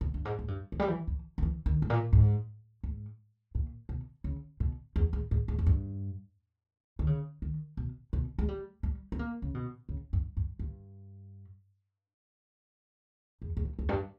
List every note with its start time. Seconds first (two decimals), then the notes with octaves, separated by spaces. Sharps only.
0.01 B2
0.14 G2
0.25 G#2
0.39 G#2
0.48 G2
0.72 E3
0.79 G3
0.88 E3
1.07 E3
1.38 D#3
1.42 E3
1.66 D#3
1.82 G#2
1.90 A#2
2.13 G#2
2.83 G#2
3.55 A#2
3.89 B2
4.24 C#3
4.60 B2
4.96 E2
5.13 G#2
5.31 G#2
5.48 G#2
5.58 E2
5.66 G2
6.99 D#3
7.07 C#3
7.42 D#3
7.77 B2
8.13 B2
8.39 G#3
8.48 G3
8.83 G3
9.12 B3
9.19 A#3
9.42 C#3
9.54 B2
9.89 C#3
10.13 G2
10.37 G2
10.59 G2
13.42 E2
13.57 G#2
13.65 G2
13.79 E2
13.89 G2